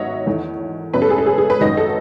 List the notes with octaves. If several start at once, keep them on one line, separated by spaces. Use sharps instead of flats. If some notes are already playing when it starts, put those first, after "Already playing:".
Already playing: G#1 G#2 F#3 B3 C#5 D#5 E5 F#5
E2 D#3 A3
F#2 C#3 F#3 B3 B4
A4
G#4
A4
G#4
G#4
B4
G#1 F#2 D#3 F#3 D#5
A4